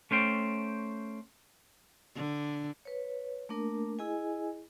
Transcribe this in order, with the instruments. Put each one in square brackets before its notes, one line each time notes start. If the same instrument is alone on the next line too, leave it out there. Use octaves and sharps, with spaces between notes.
[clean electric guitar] A3 C#4 C5 G5
[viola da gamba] D3
[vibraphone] B4 C#5
A3 A#3 D4 A#4
E4 G#4 D#5 G#5